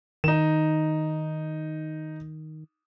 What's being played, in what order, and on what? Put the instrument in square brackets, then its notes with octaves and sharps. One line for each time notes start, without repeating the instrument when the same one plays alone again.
[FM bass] D#3 [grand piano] D#4 E7